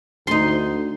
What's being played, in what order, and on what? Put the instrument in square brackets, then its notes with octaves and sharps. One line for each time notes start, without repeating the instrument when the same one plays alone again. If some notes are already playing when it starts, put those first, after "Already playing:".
[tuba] D2 [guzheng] D#4 C6